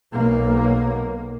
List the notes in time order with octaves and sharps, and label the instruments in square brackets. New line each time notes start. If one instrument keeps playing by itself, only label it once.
[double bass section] B1 A#3